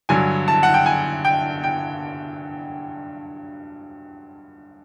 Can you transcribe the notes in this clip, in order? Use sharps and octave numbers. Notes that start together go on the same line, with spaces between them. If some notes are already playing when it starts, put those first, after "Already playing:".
G2 D3 F#3 G#5
A5
F#5
G5
G#5
G5
G5